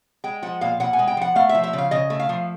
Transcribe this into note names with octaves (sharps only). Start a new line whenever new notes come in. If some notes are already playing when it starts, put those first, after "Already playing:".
G#3 G5
F3 F#5
A#2 F5
A#2 F#5
G#5
G#3
G5
F3 F#5
A3 F5
E5
F3
E5
C#3
F5
C#3 D#5
A3
F5
F3